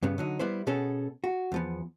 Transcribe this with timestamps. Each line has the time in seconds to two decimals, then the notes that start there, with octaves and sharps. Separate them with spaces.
0.03 G2 C#3 B3
0.18 D3 F#3 D#4
0.39 G3 B3 E4 C5
0.67 B2 B3 C#4 G#4 A4
1.24 F#4
1.52 E2 F3 B3